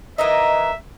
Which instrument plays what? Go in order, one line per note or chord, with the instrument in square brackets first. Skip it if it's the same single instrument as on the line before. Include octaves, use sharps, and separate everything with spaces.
[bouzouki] E3 A#3 D#4 [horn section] D#5 [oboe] E5